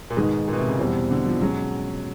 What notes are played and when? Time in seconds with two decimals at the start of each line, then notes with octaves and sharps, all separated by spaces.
0.10 A#2
0.17 G#2 B2 D#3 G#3
0.48 A#2
0.53 B2
0.59 C3
0.68 C#3
0.79 E2 B2 G3 C4 E4
1.11 D3
1.26 F3
1.42 B2 F#3 G#3 C#4